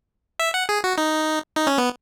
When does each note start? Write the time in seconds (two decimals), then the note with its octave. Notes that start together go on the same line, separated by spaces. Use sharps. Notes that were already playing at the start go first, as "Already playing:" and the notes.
0.40 E5
0.54 F#5
0.69 G#4
0.84 F#4
0.98 D#4
1.56 D#4
1.67 C#4
1.78 B3